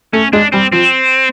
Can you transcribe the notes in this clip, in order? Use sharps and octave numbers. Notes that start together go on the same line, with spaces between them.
A3 C#4
G#3 D4
G3 C4
F3 C4